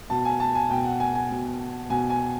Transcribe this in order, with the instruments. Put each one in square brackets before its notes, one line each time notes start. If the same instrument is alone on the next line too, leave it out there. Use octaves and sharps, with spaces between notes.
[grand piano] B2 A5
G#5
A5
G#5
B2 G5
F#5
G#5
G#5
B2
B2 G#5
G#5